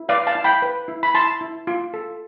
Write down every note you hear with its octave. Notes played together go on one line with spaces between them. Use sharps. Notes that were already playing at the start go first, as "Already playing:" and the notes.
Already playing: E4
B4 D5 F5
F5 A5
E4
G5 B5
B4
E4
B5
E4 A5 C6
E4
F4
A4